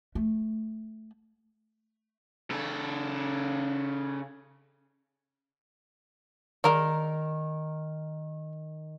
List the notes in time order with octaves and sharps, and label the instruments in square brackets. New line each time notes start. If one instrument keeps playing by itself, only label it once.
[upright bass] A3
[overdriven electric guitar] C#3 A4
[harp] D#3 [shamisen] G#3 A#4 D5